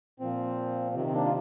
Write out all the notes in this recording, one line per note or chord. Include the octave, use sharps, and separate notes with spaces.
A#2 F3 C4
C3 D#3 C4
C4
A#3 D4
F4